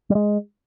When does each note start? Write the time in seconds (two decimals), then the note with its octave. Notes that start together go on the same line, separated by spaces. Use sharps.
0.10 G3
0.15 G#3